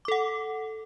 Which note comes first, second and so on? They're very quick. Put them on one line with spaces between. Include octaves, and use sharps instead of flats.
D6 A4 F#5